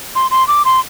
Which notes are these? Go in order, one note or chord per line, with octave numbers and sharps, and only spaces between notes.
C6
C6
D6
C6